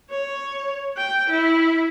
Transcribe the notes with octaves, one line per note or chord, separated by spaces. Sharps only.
C#5
G5
E4